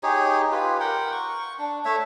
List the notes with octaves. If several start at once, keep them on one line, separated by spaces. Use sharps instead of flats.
D#4 G4 G#4 C#5
F4 G4 B4
A#4 F#5 G5
C#6
D4
A3 C#5 E5